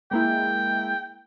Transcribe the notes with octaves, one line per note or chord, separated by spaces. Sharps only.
G#3 A#3 E4 G5